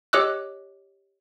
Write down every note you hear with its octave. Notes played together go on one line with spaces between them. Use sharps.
G4 C#5 D#5 D6 E6 F#6